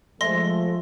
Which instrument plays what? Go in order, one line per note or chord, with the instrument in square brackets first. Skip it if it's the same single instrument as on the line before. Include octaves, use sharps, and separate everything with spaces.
[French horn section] F3 [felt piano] G#3 E5 [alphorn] A3 [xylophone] C6 A#6